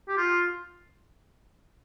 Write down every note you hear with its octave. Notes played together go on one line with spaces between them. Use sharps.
G4
F4